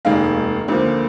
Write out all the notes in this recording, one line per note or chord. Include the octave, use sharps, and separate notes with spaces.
F1 D#2 D#3 G#3 F5
D2 D3 F3 A#3